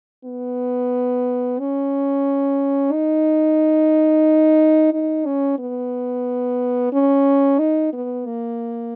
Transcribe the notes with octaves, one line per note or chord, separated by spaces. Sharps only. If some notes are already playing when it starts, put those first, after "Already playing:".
B3
C#4
D#4
D#4
C#4
B3
C#4
D#4
B3
A#3